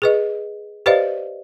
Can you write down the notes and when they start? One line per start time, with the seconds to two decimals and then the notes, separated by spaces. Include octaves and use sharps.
0.02 G#4 B4 D#5
0.86 G4 B4 C5 D5 D#5 F5